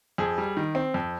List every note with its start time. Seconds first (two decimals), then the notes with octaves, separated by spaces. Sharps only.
0.18 F2 G#4
0.38 G3
0.57 D#3
0.75 C4
0.94 F2